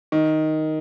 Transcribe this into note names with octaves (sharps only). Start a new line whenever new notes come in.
D#3